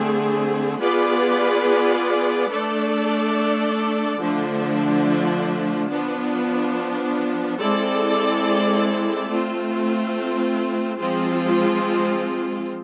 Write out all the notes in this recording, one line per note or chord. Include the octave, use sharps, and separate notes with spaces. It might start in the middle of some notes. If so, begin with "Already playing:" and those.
Already playing: D3 A3 C4 G#4
B3 F4 G#4 B4 D5
A3 D4 A4 D5
D3 F3 A3 D4
F3 B3 D4
G#3 C4 E4 A4 D5
A3 C4 F4
F3 G#3 C4 F4